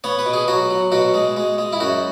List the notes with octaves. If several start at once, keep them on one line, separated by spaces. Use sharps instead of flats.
B3 C#5
B4
B2
G#4
F#3 F#4
F#3
B2 F#4
G#3
G#3
G#3
E4
F#2 F#4